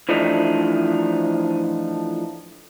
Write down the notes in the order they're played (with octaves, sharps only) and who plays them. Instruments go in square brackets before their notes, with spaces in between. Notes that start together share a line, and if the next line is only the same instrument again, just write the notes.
[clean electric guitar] E3 F3 A3 D4 D#4